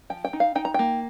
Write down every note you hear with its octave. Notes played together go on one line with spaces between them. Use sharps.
F3 G5
G5
D#4
F5
D#4 G5
A#5
A#3 G5